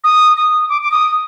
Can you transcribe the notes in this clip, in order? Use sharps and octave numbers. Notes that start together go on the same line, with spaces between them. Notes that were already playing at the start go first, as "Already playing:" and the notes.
D#6
D#6
D6
D6
D#6